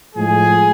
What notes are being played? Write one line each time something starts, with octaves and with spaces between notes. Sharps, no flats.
A2 F3 G#3 G#4